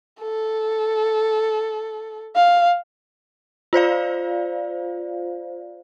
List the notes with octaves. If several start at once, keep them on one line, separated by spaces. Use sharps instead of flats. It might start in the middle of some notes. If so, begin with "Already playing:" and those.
A4
F5
F4 C5 D5 F5